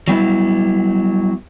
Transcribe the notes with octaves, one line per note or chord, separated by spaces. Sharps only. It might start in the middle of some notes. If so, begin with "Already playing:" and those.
F#3 G3 B3 E4